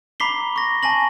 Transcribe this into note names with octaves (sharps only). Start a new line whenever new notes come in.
A#5 B5 D6 B6 C7 G7
C#6 A#6
G#5 A5 A#6 F#7